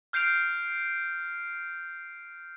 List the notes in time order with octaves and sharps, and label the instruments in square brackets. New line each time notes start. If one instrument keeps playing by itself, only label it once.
[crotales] F6 G6 C7 D7 F7